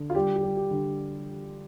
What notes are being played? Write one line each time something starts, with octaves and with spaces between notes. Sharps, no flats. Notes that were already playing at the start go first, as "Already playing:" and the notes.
Already playing: D3
F4
G3 G4
G4
G3
G4
D3